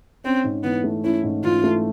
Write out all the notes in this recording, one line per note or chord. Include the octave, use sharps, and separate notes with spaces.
C4 C#4
G#2
E3 B3
A3
C#4 E4
G#2
E3 F4
A3